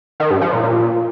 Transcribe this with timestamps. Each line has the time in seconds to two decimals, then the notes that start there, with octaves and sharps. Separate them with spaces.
0.20 D#3
0.31 G2
0.41 F3
0.52 A#2
0.63 A#2